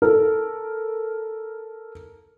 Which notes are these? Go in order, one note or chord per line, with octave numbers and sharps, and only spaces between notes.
A4 A#4